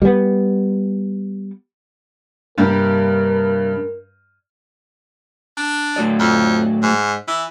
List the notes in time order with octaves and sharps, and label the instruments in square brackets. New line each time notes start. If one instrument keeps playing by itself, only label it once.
[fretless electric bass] G3 B3
[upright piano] G2 [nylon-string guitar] C3 G3 A#3 [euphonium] A#4
[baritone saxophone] D4
[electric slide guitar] A2 F#3 D5
[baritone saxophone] F2
G#2
E3